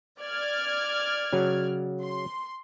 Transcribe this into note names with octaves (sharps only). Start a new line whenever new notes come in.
D5 F6 G#6
C#3 F#3
C6